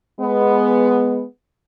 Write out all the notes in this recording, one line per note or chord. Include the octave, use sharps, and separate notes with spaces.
G#3 B3